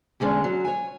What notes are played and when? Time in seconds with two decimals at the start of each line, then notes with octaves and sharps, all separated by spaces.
0.20 E2 D3 G#3 C#4
0.44 F#3
0.65 C#5 G#5